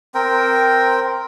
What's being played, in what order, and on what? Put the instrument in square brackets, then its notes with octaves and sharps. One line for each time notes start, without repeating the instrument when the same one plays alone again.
[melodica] C4 A#4 G5